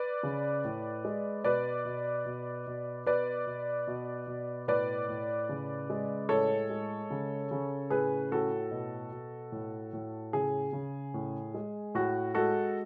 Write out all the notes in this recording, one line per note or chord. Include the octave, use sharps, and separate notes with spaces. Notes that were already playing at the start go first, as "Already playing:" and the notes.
Already playing: B4 D5
C#3
A2
G#3
B2 B4 D5
B2
B2
B2
B2 B4 D5
B2
B2
B2
A2 B4 D5
A2
C#3
G#3
A2 A4 C#5
G#3
C#3
C#3
A2 G#4 B4
A2 F#4 A4
B2
B2
A2
A2
C#3 G#4
C#3
A2
G#3
A2 F#4
G#3 F#4 A4